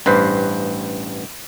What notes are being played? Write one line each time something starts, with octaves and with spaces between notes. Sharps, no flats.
A1 G2 B4 C5